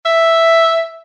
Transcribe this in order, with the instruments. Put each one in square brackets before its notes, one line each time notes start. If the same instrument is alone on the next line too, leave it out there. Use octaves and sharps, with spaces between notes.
[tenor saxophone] E5